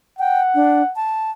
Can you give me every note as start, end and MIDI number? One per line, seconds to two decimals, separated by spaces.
0.19 0.92 78
0.19 0.41 79
0.55 0.82 62
0.96 1.31 81